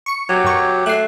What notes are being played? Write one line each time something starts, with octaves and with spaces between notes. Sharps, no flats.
C#6 C#7
F#3 G4
F#2 C#6
A3 F#6 C7